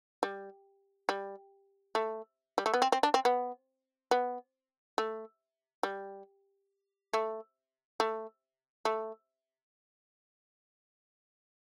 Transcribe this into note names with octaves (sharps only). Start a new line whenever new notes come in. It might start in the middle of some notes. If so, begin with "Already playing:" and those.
G3
G3
A3
G3
A3
B3
C4
C4
D4
C4
B3
B3
A3
G3
A3
A3
A3